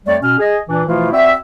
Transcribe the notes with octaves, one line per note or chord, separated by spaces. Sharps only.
F2 G3 A3 C#5 D5
B2 C#4 F6
G#4 D#5
A#2 E3 D4
B2 E3 F3 A3 E4 F4
C4 F#4 D5 E5